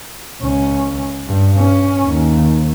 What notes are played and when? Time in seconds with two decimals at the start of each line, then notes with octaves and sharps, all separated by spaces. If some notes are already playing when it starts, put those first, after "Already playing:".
0.42 C#2 C#4
1.27 G2
1.58 C#4
2.04 D#2